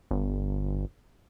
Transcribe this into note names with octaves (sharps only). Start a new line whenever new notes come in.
G1